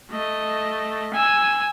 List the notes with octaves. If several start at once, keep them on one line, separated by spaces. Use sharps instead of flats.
A3 D#5
G#5 E6